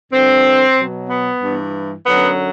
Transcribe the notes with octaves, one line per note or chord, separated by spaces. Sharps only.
G2 D3 F3 C4
B2 F#3
B3
G2 E3
F#2 D3 F#3 B3